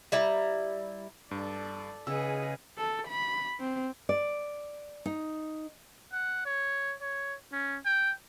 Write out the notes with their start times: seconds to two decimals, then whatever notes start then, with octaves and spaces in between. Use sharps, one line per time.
0.12 G3 E4 A#5
1.31 G2 A4 D5
2.07 C#3 G#4 B4 D#5 F#5 G#5 E6
2.78 A4
3.08 B5
3.60 C4
4.09 D5
5.06 D#4
6.12 F#5
6.46 C#5
7.02 C#5
7.52 C#4
7.85 G5